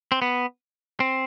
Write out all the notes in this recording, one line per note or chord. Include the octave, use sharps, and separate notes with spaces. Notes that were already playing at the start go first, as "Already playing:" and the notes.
C4
B3
C4